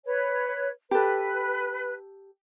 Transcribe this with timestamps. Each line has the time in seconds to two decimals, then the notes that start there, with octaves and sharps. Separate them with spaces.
0.05 B4 C#5
0.91 G4 A4 B4